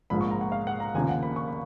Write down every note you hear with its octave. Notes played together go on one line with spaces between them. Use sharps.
A#1 G#2 F3 A#3 B5
C#6
A#5
F#5
F5
F#5
A#5
F1 D#2 C#3 F3 A#3 G#5
F#5
B5
C#6
B5